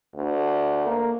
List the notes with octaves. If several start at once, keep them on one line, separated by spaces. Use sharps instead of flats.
D2
A#3